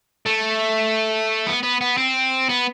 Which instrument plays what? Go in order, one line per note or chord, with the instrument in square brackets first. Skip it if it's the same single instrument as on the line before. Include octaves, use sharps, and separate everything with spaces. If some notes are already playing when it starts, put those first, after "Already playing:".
[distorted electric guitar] A3
B3
B3
B3
C4
B3